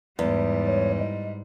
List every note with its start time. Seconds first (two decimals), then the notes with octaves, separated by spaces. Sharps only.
0.19 E2 G#2 G3
0.66 C#5
0.99 D#5